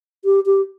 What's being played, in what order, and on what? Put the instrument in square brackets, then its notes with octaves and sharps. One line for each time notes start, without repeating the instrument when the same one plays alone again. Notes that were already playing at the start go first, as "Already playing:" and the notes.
[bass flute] G4
G4